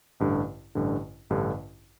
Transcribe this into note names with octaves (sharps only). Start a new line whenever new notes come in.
A1 G2 D3
A1 G2 D3
A1 G2 D3